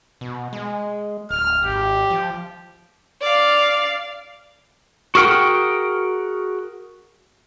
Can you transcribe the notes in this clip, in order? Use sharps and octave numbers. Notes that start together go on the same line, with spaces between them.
B2
G#3
D1 F6
G#1 G4
F3
D5 F5
F#4 G#4 A#4 F#5 G5